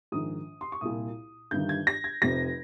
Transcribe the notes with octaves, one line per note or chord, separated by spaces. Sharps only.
A#1 G#2 D#3 D#6
C6
C#6
C2 A#2 D#6
G1 G2 D#3 G6
G#6
A#6
G#6
F1 F2 C3 A#6